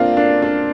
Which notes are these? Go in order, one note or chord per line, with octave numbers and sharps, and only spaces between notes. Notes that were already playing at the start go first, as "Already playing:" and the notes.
Already playing: A#3 C4 D4 F4
D4
D4